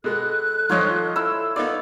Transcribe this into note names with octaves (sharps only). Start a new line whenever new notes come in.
B2 G#3 A4 F#6
D#3 F3 F4 C#5 D#5
E4 E6
B3 D#4 F4 D5